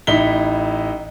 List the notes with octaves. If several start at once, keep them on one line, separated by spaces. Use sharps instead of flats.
A1 D#4 E4 B6 G7